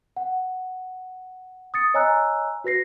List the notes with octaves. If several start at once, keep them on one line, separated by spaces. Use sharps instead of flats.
F#5
D#6 A6 C#7
C#5 D#5 G#5 A#5 E6 F#6
F#4 B4 A#6 C7